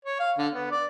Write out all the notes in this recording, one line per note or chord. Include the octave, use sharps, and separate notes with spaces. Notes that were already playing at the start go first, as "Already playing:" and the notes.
C#5
F5
D3
B3
D5